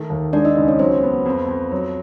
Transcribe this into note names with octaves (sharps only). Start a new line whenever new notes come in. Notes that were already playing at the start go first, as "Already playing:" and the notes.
Already playing: D#3 A3
D#2
G#3 D4 D5
D#4 D#5
C#2
C#4 C#5
F#3 C4 C5
B3
F2
F2
F#3